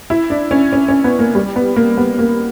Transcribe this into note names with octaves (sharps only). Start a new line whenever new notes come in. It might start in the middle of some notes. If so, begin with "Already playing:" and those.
E4
D4
C#4
C#4
C#4
B3
A#3
G3
B3
A#3
B3
A#3